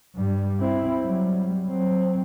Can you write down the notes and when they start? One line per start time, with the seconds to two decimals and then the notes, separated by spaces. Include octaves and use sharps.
0.15 G2 G3
0.60 C4 E4
1.03 F#3 G3
1.68 F#3 C4